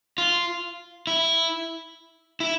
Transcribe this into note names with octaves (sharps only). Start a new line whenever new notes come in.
F4
E4
E4